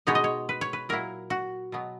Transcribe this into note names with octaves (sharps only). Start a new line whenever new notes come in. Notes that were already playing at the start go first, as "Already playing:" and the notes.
B2 G#3 B3 D#4 C#5
D#5
C#5
B4
C#5
B4
A#2 F#3 A#3 E4 A#4
F#4
B2 F#3 B3